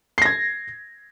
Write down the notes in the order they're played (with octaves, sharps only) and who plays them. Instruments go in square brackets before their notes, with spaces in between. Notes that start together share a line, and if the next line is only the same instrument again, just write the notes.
[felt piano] C7
A#6
G#6